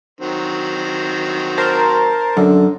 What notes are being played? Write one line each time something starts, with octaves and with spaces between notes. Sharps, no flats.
D#3 F#3 C4
A#4 C5 A5
F#2 D3